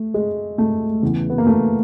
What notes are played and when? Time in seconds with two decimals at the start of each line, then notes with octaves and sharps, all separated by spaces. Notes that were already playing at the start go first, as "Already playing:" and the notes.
Already playing: A3
0.14 G#3
0.58 A3
1.02 E2 C#3 E3
1.30 B3
1.38 A#3
1.47 A3